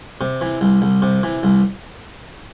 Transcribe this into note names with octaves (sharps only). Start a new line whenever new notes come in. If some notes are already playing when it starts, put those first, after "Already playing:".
C3
E3
C2
C2
C3
E3
C2